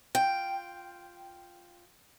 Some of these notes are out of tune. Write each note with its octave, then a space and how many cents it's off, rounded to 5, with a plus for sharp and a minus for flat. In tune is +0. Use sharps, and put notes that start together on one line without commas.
F4 +0 G5 +0